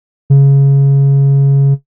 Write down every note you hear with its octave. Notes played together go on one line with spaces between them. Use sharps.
C#3